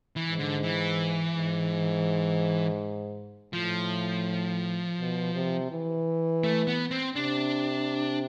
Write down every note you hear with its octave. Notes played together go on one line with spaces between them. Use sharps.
E3
G#2
D3
E3
G#2
A2 F3
B2
C3
E3
A3
B3
C4
C3 D4